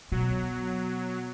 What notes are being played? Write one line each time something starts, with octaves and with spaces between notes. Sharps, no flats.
B2 F#3